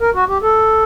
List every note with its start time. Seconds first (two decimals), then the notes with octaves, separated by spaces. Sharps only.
0.01 A#4
0.15 F#4
0.28 G4
0.42 A4